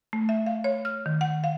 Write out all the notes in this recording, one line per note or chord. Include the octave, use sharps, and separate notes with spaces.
A3
E5
F5
C#5
F6
D#3
F#5
F5